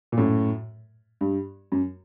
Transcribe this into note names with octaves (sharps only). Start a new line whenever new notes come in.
A#2
F#2 A2
G2
F#2